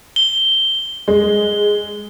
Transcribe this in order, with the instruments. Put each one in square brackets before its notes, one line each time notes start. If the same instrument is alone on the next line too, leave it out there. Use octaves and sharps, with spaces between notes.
[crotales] G7
[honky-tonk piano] G#3